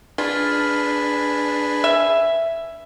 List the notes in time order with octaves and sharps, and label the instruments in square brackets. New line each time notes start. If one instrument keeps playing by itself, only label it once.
[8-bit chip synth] D4 [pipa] F4 [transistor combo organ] G#4 B4
[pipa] E5